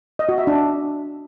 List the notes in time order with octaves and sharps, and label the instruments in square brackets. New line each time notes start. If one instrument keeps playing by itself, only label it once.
[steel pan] D#5
F#4
E5
D4